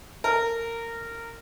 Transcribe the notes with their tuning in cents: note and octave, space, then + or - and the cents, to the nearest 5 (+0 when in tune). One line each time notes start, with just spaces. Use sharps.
A#4 -20